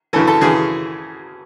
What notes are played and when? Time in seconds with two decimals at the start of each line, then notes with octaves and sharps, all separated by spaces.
0.13 F#2 C#3 E3 A4
0.27 A4
0.41 F#2 C#3 E3 G#4